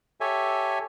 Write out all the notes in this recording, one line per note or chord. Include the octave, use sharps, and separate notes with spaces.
G4 A4 C#5 E5 G#5